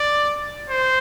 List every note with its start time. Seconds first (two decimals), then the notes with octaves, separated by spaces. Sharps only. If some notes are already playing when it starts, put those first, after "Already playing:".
Already playing: D5
0.70 C5